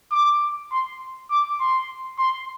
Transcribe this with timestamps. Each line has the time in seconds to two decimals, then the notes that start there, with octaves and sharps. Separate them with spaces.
0.12 D6
0.72 C6
1.31 D6
1.60 C6
2.19 C6